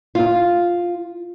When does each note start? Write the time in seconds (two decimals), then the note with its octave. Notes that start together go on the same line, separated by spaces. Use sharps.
0.15 F4